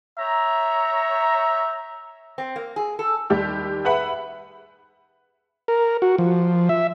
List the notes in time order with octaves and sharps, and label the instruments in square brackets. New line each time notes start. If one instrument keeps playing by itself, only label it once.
[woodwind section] C#5 G5 A#5 [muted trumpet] E5
[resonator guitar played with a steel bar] C4
A#3
G#4
A4
[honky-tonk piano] D#2 G3 G4 E6
G#4 B4 E5 F#5 B5
[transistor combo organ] A#4
F#4
F3
E5